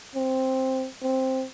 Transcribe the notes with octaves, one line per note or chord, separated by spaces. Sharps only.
C4
C4